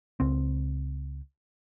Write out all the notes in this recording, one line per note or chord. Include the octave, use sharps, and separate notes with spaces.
C#2 C4